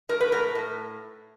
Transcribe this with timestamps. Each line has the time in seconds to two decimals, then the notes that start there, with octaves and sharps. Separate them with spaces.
0.09 A2 A#4
0.21 B4
0.32 A2 A#4
0.55 A2